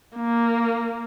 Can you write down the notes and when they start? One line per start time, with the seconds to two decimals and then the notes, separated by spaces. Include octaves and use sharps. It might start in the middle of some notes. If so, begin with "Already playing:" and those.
0.16 A#3